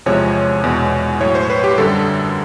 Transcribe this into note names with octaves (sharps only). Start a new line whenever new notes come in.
E2 C3 F3 G#3 C#5
E2 B2 G#3
A2 F#3 C#5
C5
B4
G4
F#2 D3 G3 A4